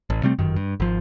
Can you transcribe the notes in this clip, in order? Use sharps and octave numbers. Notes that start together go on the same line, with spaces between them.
A1
C3 G3 A3 C4
G1 F#2 D#3
G2
G#1 F3